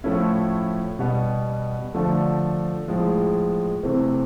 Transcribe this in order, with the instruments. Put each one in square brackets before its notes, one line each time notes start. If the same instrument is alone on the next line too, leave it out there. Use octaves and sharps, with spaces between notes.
[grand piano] A2 F3 A3 C#4 E4
B2 G3 B3
D3 F3 A3
A2 F3 G#3
C3 E3 A3 C4